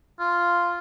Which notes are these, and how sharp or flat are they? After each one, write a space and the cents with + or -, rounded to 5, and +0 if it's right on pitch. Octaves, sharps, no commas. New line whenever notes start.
F4 -5